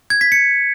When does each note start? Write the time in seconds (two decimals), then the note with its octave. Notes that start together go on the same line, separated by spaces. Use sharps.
0.10 G#6
0.21 B6
0.32 C#7